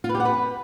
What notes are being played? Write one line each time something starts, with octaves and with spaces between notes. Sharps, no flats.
F4
B4
G4
F#5
B4